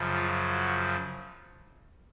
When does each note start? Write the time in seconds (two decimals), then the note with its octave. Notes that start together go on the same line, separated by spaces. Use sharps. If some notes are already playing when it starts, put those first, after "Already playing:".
Already playing: F#2 C#3 F3
0.15 F4
0.52 F#4